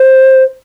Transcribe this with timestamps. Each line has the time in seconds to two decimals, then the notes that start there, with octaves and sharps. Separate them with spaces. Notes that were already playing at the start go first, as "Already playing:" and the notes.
Already playing: C5